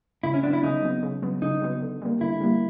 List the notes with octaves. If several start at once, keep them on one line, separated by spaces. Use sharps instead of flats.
C#3 E4
C#4
F#3 B3 D4
E4
C#3 D#4
F#3 B3
C#3
F#3 B3
C#3 D#4
F#3 B3
D3
G3 A#3
D3 E4
G3 A#3